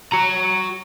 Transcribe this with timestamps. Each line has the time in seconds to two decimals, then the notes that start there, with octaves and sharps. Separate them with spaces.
0.12 F#4 A#5